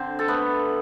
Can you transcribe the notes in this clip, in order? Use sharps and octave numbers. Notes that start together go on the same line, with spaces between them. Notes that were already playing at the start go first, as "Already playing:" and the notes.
Already playing: D3 C4 C5
A4
A3 B3 B4